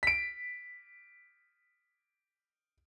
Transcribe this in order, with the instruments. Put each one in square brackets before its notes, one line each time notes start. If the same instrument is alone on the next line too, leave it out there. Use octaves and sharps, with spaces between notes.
[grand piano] B6 D7